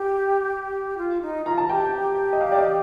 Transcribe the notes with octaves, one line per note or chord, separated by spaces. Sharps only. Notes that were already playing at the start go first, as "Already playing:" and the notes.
Already playing: G4
F4
D#4
F4 A#5
A5
G4 G5
D#5
F5
D5
D#5